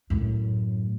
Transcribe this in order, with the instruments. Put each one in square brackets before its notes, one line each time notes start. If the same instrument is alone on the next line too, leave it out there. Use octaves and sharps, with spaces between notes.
[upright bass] F#2 A2